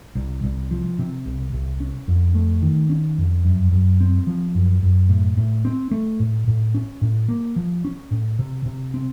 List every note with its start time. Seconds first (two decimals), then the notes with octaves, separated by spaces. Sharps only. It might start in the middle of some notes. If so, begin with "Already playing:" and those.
0.15 C2
0.44 C2
0.71 F3
0.99 C3
1.26 C2
1.53 C2
1.80 C#4
2.08 F2
2.35 A3
2.62 D#3
2.90 C#4
3.18 F2
3.45 F#2
3.72 F#2
4.01 C4
4.27 F3
4.55 F#2
4.83 F#2
5.09 A2
5.37 A2
5.65 C4
5.91 A3
6.20 A2
6.47 A2
6.75 C#4
7.01 A2
7.28 A#3
7.56 F3
7.84 C#4
8.11 A2
8.39 C3
8.66 C3
8.94 C4